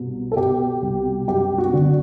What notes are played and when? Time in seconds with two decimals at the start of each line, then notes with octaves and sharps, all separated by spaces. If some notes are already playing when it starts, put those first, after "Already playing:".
Already playing: C2 B2
0.32 A4
0.37 B2 G4
0.82 C2
1.28 F#2 G4
1.58 F#4
1.73 D3